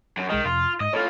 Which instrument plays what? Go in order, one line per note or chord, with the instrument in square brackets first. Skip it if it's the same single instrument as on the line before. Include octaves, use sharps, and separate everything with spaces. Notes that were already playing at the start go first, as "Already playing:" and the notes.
[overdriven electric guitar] F#2
[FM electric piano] B1 G#3 D#5 [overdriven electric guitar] D#3
[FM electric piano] F2 C3 [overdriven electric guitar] F4
[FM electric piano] G#2 [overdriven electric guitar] D#5
[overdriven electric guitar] A2 F4 [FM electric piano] A4 C#5